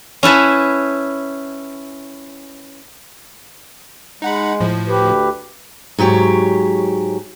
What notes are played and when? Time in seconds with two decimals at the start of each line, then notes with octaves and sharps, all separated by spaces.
0.23 C#4 E4 B4 A5
4.22 G#3 D#4 F#5 B5
4.60 A2 F3
4.88 D2 G4 B4
5.98 G#2 F#3 G4 C#5